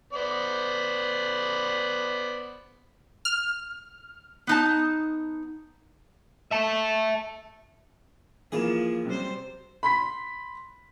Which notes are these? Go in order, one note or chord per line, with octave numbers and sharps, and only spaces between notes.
B3 C5 D5
F6
B3 D#4 A5
E5 A5
E3 F3 A#3 G#4 E7
C3 F#3 G3 C5
B5 C6 B6